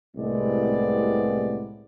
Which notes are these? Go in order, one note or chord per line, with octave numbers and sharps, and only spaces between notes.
C2 A2 C3 G#3 B3 D5